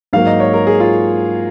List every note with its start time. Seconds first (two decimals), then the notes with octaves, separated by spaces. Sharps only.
0.13 G#2 F#3 A#3 F5
0.27 D#5
0.40 C#5
0.54 A#4
0.67 G#4
0.80 F4